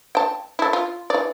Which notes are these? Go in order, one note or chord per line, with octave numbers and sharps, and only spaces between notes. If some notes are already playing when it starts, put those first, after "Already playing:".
G5 A5
E4 A4
F4
E3 D5